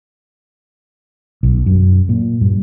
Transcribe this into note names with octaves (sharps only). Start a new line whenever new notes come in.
B1
F#2
A#2
G2